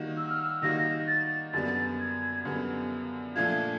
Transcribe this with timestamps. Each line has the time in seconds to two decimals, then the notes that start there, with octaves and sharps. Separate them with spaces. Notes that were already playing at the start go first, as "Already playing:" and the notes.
Already playing: D#3 G3 A#3 D#4 F#4
0.17 E6
0.30 F6
0.42 E6
0.62 D#3 G3 A#3 D#4 F#4 A#6
1.08 A6
1.53 F#2 D3 G3 B3 A6
2.00 G#6
2.45 F#2 D3 G3 B3
3.36 A#2 F3 A3 D4 F4 G#6